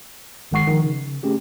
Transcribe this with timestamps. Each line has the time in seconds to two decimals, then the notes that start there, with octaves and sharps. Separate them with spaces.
0.51 G1 D#3 G#3 F#5 C#6 C7
0.67 D#3 F3
0.84 C#3
1.23 A3 C#4 G4 G#4